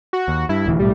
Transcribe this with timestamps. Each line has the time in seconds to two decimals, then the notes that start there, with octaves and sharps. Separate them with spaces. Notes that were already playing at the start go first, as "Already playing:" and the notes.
0.13 F#4
0.28 D#2
0.49 G2 E4
0.66 D#1 D2 E3
0.79 B1 A2 G3